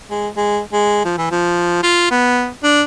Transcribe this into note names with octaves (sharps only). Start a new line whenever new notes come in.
G#3
G#3
G#3
F3
E3
F3
F4
B3
D4